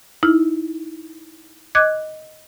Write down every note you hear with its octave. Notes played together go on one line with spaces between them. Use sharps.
D#4 E4 F6
D#5 D6 F#6 G#6